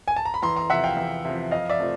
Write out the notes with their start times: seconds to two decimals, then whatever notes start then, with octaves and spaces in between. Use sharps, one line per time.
0.08 G#5
0.16 A5
0.25 A#5
0.34 B5
0.42 E2 A#5 C6
0.56 A#5 C6
0.70 C3 F3 E5 F#5
0.84 F5 G5
0.97 E2
1.25 C3 F3
1.51 F2 D#5 F5
1.70 D5 E5
1.79 C3 F3 A3